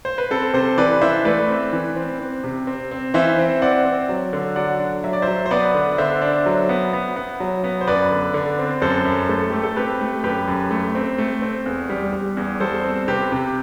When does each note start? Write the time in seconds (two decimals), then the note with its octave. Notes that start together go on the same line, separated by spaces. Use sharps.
0.05 C5
0.18 B4
0.30 C4 A4
0.54 C3 A4 C5
0.78 E3 B4 D5
1.01 E3 C5 E5
1.25 A3 B4 D5
1.49 C4
1.73 E3
1.96 C4
2.19 C4
2.44 C3
2.67 C4
2.91 C4
3.14 E3 C5 E5
3.39 C4
3.62 C4 D5 F#5
3.86 C4
4.09 F#3
4.33 D3
4.56 F#3 D5 F#5
4.80 D4
5.04 F#3 E5
5.13 D5
5.22 C5 E5
5.28 F#3
5.46 C5
5.51 B3 B4 D5
5.75 D3
5.98 D3 C5 E5
6.21 D4
6.46 F#3
6.69 B3
6.93 B3
7.16 B3
7.40 F#3
7.64 B3
7.81 C5
7.87 F#2 B4 D5
8.11 D3
8.34 D3
8.59 C4
8.82 F#2 A4 C5
9.05 F#2
9.29 A3 A4
9.50 A3 G4
9.63 A4
9.76 C4 G4 B4
10.01 A3
10.23 F#2 G4 B4
10.48 F#2
10.71 A3
10.95 C4
11.18 A3
11.42 C4
11.66 E2
11.90 G3
12.13 G3
12.37 E2
12.60 G3 A4 C5
12.84 C4
13.08 C3 G4 B4
13.32 C3